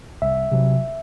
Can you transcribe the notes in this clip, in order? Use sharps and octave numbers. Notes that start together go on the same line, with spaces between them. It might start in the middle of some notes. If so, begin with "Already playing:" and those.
C2 E5
C3 F#3